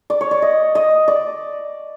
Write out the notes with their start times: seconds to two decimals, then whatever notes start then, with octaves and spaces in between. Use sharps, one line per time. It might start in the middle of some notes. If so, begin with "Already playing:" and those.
0.10 D5
0.21 C#5
0.31 D5
0.42 D#5
0.75 D#5
1.08 D5